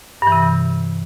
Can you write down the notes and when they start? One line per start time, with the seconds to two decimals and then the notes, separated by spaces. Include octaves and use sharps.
0.22 G2
0.27 E3
0.32 C3